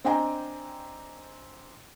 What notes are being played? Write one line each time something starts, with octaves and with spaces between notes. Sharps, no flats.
C4 D4 D#5 G5 G#5 A#5